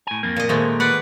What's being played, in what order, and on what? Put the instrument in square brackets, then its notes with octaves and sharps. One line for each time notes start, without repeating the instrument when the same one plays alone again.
[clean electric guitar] A2 G#5
F2 A#3
[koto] A#2 D#5
[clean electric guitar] D#2 A#2 [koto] F3 G#3 A3
[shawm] B4 [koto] D5 F#5